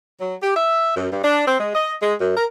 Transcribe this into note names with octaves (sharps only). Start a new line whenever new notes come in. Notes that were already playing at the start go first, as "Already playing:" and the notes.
F#3
G4
E5
F#2
G2
D4
C4
G#3
D#5
G#3
F#2
A#4